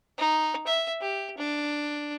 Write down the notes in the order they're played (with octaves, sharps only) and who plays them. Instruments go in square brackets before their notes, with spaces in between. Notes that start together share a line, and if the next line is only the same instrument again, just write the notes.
[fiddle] D#4
E5
G4
D4